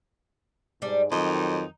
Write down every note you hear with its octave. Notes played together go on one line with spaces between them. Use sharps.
G#2 G3 D4
F2 D#3 F#3 D#4